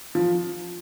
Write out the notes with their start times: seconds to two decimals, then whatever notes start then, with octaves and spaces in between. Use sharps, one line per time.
0.15 F3